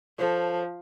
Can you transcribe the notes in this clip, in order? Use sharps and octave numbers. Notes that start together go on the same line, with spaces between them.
F3 A4 C5 C#5